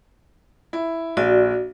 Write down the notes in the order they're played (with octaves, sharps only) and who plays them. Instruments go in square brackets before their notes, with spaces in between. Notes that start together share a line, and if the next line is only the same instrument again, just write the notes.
[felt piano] E4
[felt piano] A#1 [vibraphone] F#4 D5